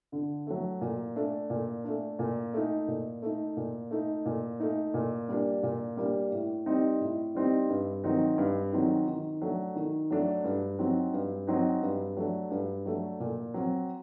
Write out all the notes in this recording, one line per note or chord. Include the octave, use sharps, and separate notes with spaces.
D3
F#3 A3
A#2
A3 D4
A#2
A3 D4
A#2
A3 D#4
A#2
A3 D#4
A#2
A3 D#4
A#2
A3 D#4
A#2
G3 A#3 D4
A#2
G3 A#3 D4
A2
G3 C4 D#4
A2
G3 C4 D#4
G2
D#3 F#3 C4 D#4
G2
D#3 F#3 C4 D#4
D#3
F#3 A3 D4
D#3
F#3 A3 D4
G2
F#3 C4 D#4
G2
F#3 C4 D#4
G2
F#3 A3 D4
G2
F#3 A3 D4
A#2
F#3 C4